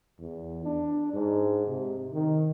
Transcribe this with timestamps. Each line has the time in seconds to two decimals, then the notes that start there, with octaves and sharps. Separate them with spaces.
0.19 E2
0.65 D4
1.13 G#2
1.68 C3
2.13 D#3